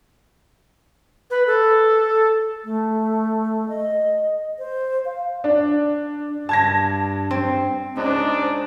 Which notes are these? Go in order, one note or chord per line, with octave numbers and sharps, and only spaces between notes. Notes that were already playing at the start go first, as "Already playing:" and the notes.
B4
A4
A3
D#5
C5
F5
D4
G2 A5 G#6 A#6
C4
C#2 G#2 D4 C5